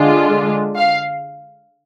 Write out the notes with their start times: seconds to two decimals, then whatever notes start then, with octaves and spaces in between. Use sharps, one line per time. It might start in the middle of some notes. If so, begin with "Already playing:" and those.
Already playing: D3 G#3 D4 F4
0.77 F5